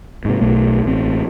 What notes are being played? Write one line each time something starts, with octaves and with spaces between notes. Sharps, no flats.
G#2 C3
B1 B2 A3
A1 C4